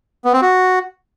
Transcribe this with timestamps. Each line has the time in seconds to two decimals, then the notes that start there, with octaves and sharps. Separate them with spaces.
0.25 B3
0.33 C4
0.42 F#4